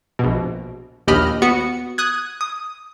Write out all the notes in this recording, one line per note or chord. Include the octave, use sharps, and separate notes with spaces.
A#1 B2
A#1 D#2 G4 D#5 B5 F6
B3 F#4 C#7
D#6 F#6 G#6
D#6